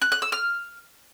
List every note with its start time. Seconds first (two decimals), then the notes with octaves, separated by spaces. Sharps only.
0.02 F#6
0.12 F#6
0.22 E6
0.32 F6